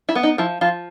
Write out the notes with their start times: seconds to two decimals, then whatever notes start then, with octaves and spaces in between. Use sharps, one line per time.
0.09 E4
0.15 B3
0.23 D#4
0.38 F3 E4
0.61 F3 F4